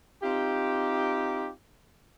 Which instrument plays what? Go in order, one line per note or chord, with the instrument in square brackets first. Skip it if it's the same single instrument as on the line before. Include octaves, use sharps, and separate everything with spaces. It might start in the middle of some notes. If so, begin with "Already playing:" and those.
[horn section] C4 D#4 F4 G4